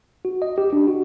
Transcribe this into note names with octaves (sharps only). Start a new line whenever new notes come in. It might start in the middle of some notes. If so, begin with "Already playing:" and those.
F#4
D#5
G4
D4
F#4